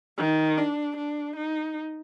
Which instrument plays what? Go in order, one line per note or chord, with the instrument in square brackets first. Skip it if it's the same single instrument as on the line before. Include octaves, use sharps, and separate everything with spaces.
[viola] D#3
D4
D4
D#4